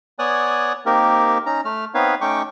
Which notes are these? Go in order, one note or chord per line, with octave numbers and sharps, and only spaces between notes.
B3 C#5 D5 G#5 D#6 F#6
A#3 C4 D#4 G4 A#4
C#4 D#4 A#5
A3 F6
B3 C4 D#4 B4 C#5 F5
A3 C#4 D#4 G5 C#6 D6